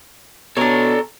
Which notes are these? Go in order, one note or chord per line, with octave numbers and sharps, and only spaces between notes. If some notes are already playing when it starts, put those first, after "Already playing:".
B2 D4 A4 C#5 A#5